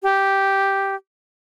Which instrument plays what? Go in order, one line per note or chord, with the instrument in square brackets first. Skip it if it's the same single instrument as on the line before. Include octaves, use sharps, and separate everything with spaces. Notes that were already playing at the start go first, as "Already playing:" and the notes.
[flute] G4